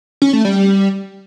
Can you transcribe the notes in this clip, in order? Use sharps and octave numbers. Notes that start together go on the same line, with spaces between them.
C#4
A3
G3